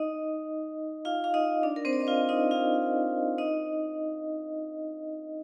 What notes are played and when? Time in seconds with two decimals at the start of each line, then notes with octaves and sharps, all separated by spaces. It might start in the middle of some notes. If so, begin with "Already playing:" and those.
Already playing: D#4 D#5
1.05 F4 F5
1.24 F5
1.34 D#4 D#5
1.63 D4 D5
1.76 A#4
1.85 C4 C5
1.93 D5
2.00 D#5
2.07 F4 F5
2.29 D#4 D#5
2.51 F4 F5
3.38 D#4 D#5